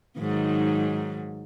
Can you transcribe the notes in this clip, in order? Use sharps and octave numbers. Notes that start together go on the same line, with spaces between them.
G#2 D#3 F#3